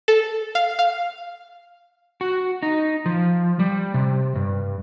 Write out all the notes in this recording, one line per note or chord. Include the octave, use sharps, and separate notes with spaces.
A4
F5
F5
F#4
D#4
F3
G3
C3
G2